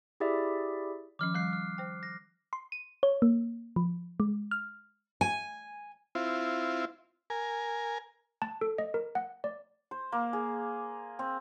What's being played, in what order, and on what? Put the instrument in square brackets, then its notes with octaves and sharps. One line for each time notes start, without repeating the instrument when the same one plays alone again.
[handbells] E4 G4 G#4 D5 E5
[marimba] D#3 F3 C#4 [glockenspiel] D6 F6
[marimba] F3 G3 [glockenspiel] F#6 C7
[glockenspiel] F6
[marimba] C5 G5
[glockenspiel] A#6
[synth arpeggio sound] C6
D#7
C#5
A#3
F3
G#3
F6
[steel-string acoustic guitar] G#5
[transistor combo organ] C4 E4 F4
A#4 G#5
[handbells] A5
A4
D#5
A#4
F#5
D5
[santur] C5
A#3
G#4
C4